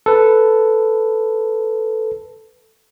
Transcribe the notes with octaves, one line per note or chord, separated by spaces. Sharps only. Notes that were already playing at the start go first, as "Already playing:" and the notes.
A4 B4